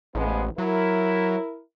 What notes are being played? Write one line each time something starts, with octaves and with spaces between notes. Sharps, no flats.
A1 F3 G#3 B3
F#3 E4 A#4